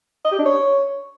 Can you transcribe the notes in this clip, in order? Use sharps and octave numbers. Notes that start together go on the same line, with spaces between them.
D#5
G4
D4
C#5